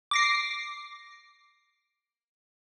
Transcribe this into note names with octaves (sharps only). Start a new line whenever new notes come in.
D6 A#6 C7